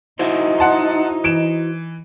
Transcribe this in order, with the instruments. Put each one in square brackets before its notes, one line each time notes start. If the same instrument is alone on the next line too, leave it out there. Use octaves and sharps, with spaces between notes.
[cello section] D#4 [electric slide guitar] E4 F#4 C5
[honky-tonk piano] F#5 A5 C6
E3 D7 E7